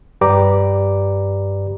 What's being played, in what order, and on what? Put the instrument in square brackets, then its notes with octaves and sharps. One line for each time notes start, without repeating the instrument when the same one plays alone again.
[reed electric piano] G2 G4 B4 D5 A#5 D6